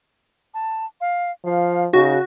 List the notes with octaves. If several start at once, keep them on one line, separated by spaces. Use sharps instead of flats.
A5
F5
F3 F5
C#3 D#4 F#4